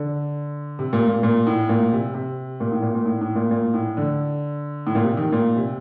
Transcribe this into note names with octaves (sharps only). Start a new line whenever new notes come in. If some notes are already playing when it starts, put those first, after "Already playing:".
Already playing: D3
C3
A#2
A#2
A#2
A2
A#2
C3
C3
A#2
A2
A#2
A#2
A2
A2
A#2
A#2
A2
D3
A2
A#2
C3
D#3
A#2
C3